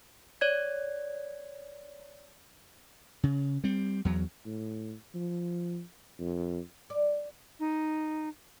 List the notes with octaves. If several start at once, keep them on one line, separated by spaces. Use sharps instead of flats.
C#5 D5 G#6
C#3
G3 C4
E2 F#3
A2
F3
F2
D5
D#4